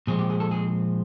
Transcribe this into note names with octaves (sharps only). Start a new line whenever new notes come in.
A#2 F3 G#3 C4 G#4
G4
G#4
A4
G#4